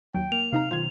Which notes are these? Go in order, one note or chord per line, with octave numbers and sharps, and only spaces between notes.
D#2 F#3 G5
A#3 F7
C3 D#4 F5 A#5
B1 D#3 F4 C5 F5 G#6